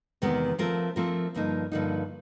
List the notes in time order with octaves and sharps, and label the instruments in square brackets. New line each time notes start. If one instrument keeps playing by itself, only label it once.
[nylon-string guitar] E2 C3 D#3 G#3 B3
F3 A3 C4 F4 A#4
F3 A3 C4 F4 A#4
G2 D3 F3 A#3 D#4
G2 D3 F3 A#3 D#4